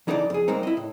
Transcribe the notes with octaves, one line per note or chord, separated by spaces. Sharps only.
B1 E3 D#4 A4 C5 D5
F2 G#4
G3 G#3 A#3 C4 D#4
E4 D#5
A2